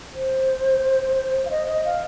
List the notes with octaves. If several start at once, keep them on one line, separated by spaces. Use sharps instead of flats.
C5
F5
D#5
D#5
F5